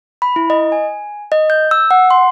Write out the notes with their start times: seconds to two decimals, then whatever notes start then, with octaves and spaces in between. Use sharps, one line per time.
0.22 B5
0.36 E4
0.50 D#5
0.72 G#5
1.32 D#5
1.50 G6
1.71 E6
1.91 F#5
2.11 C6